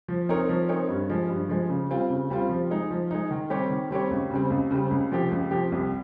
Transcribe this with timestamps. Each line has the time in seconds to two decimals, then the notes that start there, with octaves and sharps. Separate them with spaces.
0.08 F3
0.29 C4 D#4 A#4 C#5
0.49 F3
0.68 C4 D#4 A#4 C#5
0.89 G2
1.10 F3 G#3
1.30 G2
1.49 F3 G#3
1.69 C#3
1.89 G3 C4 F4
2.10 C#3
2.30 G3 C4 F4
2.49 F3
2.70 G#3 D#4
2.90 F3
3.11 G#3 D#4
3.31 D#3
3.50 G3 C4 G4 C#5
3.70 D#3
3.91 G3 C4 G4 C#5
4.11 C#2
4.30 C#3 G3 C4
4.50 C#2
4.71 C#3 G3 C4
4.91 C#2
5.11 C3 F3 C4 G4
5.31 C#2
5.51 C3 F3 C4 G4
5.72 C2